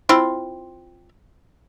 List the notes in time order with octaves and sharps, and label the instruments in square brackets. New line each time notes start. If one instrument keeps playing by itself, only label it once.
[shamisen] C4 E4 F4